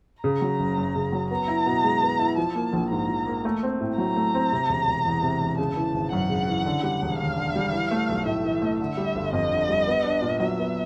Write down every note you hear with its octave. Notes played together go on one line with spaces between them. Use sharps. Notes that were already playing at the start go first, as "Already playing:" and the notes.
C#3 A#5
F#3
F#1
F#2
C#3
F#3
B3 A#5
E4
B2
G#3
B3
E4
F3 A5
A#3
A#1
G#2 A#5
F3
A#3
A3
C4
A2
F#3 A#5
A3
C4
C3
E1
E1
E2
C3
E1
C#3 A5
E3
G#1
F#2 F#5
C#3
E3
D3
G3
E1
D#2 F5
D3
G3
E3
A3
B1
A2 E5
E3
A3
D3 E5
G3
G1
F2 D#5
D3
G3
B3
D4
A#2
F#3 E5
B3